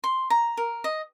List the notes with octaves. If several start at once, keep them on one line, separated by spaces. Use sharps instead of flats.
C6
A#5
A#4
D#5